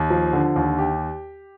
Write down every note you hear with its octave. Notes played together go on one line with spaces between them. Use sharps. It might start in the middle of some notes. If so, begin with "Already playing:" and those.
Already playing: D#2
F3
D3
D#2
G4